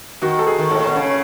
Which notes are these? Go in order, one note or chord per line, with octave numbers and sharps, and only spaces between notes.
D#3 F#4
A4
G#4
D#3
G#2 A4
A2
B2
C#3 C#4